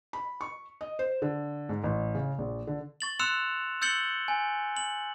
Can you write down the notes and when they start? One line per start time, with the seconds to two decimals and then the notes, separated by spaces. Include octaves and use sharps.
0.13 B5
0.41 C#6
0.81 D#5
0.99 C5
1.22 D3
1.69 G#2
1.84 A1
2.15 C#3
2.38 A#1
2.67 D3
3.01 C#6 A6 F#7
3.19 C6 E6 F#6 C#7 E7 F7
3.82 E6 G6 A6 C#7 F#7 G7
4.28 G#5
4.77 F#7